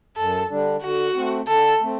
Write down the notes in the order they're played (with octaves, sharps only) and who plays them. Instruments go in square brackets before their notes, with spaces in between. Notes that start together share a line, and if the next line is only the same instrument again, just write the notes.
[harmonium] F#2 [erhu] A4
[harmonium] D3 G3 D4
[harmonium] D3 [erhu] F#4
[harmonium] A3 C4
[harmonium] D3 [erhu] A4
[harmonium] A3 C4